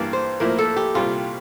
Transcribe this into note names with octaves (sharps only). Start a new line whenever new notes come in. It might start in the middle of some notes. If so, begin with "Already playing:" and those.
Already playing: G2 E3 A#3 D5
C5
A2 F3 A#3 E4 A#4
A4
G4
C2 A#2 G3 F4